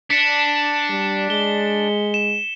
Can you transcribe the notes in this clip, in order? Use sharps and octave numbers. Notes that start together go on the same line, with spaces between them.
D4 B6 C#7 E7
G3
G#3 G7
E7